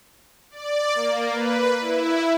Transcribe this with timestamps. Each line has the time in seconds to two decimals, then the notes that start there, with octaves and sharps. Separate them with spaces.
0.51 D5
0.95 A#3
1.34 B4
1.80 E4